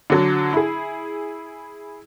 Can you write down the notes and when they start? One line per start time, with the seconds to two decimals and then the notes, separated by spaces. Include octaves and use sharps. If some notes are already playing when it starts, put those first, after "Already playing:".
0.10 D3 F#3
0.53 E4 G#4